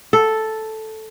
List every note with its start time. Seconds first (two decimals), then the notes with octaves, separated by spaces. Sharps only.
0.13 A4